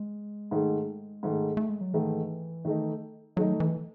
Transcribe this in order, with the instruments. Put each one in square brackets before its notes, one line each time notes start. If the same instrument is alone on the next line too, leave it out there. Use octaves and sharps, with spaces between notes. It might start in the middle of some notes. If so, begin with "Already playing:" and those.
Already playing: [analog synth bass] G#3
[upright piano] G#2 D#3 A3
G#2 D#3 A3
[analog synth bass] A3
G#3
F#3
[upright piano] G#2 D#3 A3 [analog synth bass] E3
[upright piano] D#3 A3 D#4
[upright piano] D#3 A3 D#4 [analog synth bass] F#3
[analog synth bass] E3